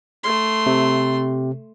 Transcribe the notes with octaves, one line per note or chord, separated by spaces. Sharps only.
A3 C6
C3